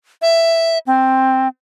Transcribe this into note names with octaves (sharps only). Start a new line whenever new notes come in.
E5
C4